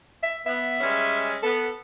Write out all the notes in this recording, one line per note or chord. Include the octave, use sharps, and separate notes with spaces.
E5
B3 E5
G3 G#3 C#4
B3 A4